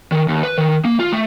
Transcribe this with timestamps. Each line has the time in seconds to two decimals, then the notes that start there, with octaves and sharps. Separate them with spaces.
0.12 D#3
0.28 D#2
0.43 B4
0.58 D#3
0.85 A#3
1.00 F4
1.13 A3